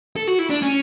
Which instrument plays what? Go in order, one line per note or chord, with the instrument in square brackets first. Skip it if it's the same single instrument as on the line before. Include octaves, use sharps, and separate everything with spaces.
[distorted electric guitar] A4
F#4
E4
D4
C#4